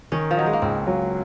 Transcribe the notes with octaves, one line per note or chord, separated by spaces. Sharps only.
D#3 C#4
F3
F#3 D#4
G#3
A#3
C#2 C4
F#3